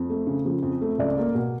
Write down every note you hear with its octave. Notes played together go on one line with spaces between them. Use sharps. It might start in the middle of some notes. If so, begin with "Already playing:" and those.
Already playing: F2
A3
C#3
F3
F2
A3
C#2 D5
A#3
B2